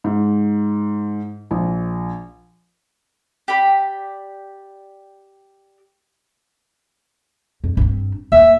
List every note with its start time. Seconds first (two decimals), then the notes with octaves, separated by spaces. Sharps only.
0.04 G#2
1.51 A#1
3.48 G4 D5 B5
7.64 F2
7.77 G2 C4
8.32 D#2 E5